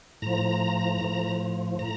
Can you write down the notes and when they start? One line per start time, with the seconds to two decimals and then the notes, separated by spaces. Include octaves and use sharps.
0.22 A2 F3 A#5
1.01 A2 F3
1.79 A2 A#5